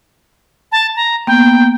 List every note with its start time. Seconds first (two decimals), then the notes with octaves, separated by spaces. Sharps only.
0.72 A5
0.96 A#5
1.27 A#3 B3 G5